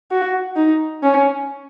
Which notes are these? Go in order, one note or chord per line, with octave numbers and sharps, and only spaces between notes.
F#4
D#4
C#4